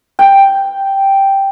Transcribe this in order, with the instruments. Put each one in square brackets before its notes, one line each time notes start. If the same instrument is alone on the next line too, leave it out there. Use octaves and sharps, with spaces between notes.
[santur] G5